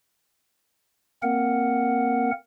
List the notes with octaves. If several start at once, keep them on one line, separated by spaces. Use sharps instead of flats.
A#3 C4 A#4 F#5